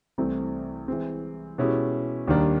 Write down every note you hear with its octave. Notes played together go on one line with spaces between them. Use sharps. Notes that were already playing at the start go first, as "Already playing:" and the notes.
C2 C3 E3 A3 C4
E3 G#3 C4
B2 G#3 C#4 E4 G4
D#2 D#3 G3 A#3 D4